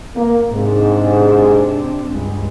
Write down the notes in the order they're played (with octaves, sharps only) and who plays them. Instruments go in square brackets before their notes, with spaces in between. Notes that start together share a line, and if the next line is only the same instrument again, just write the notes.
[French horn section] A#3
[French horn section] G#2 [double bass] C3 D4
[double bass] C#2 G2